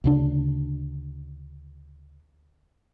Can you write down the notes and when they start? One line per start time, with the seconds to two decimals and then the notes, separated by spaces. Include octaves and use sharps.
0.04 D2 C#3 D4